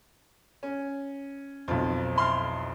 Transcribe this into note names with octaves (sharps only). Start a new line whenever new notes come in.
C#4
B1 F2 F4
E4 C6 F6